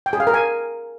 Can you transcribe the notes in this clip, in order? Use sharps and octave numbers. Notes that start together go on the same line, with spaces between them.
G5
G#4
F5
A#4
G#5